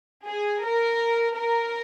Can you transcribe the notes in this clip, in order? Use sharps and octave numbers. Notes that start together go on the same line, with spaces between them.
G#4
A#4
A#4